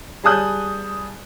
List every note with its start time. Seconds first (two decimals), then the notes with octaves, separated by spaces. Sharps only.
0.24 G3 G#4 A5 D#6 F#6 G6